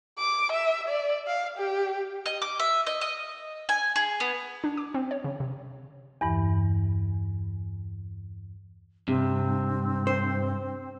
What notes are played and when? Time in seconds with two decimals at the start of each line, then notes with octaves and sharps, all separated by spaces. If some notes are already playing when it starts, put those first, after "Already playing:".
0.19 D6
0.52 E5
0.88 D5
1.27 F5
1.58 G4
2.26 D#5
2.42 D6
2.60 E5
2.87 D#5
3.01 D#5
3.69 G#5
3.96 G#4
4.20 B3
4.64 D4
4.77 D6
4.94 C4
5.11 C#5
5.24 C#3
5.40 C3
6.21 E2 G2 E3
9.08 G2 C3 C4
10.07 C5